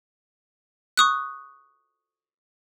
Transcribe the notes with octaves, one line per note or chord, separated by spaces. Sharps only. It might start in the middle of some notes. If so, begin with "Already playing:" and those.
C#6 D#6 F#6